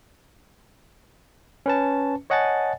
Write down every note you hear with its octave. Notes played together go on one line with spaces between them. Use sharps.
C#4 B4 A5
C#5 D#5 F#5 G#5 A5 A6